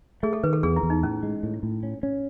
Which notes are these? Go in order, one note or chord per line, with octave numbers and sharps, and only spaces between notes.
A3 G#4
A4
D#3 B4
A4
E2 G#4
E4
E2
D#4
A2 C#4
G#3
A2
A2
C#4
C#4